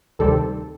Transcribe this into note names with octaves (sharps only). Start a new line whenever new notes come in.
D2 C3 D#3 G3 C4 A4